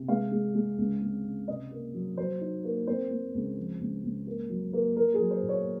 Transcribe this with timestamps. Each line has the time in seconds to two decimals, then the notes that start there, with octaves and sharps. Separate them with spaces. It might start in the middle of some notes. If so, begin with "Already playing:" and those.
Already playing: C3
0.08 G#3 F5
0.32 G#3
0.55 G#3
0.78 C#2
1.01 C4
1.25 C#3
1.48 C3 D#5
1.71 A#3
1.94 F#3
2.17 F#3 C5
2.41 D#4
2.64 A#3
2.87 C4 C5
3.11 C4
3.34 C#2
3.57 F3
3.80 C#2
4.03 C#2
4.27 A#3
4.50 F#3
4.73 A#3
4.96 A#3 A#4
5.14 G#4
5.19 F#3
5.31 C5
5.43 A#2
5.49 C#5